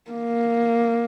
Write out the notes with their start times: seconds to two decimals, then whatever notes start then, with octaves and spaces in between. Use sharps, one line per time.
0.11 A#3